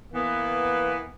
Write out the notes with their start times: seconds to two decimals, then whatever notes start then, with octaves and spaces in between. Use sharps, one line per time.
0.12 E3 A#3 B3